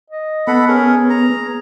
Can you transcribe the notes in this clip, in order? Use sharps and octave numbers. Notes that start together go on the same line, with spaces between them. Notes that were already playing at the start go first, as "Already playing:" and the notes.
D#5
B3 A4 F#5 B5
C#4 G#4 A#4
A#5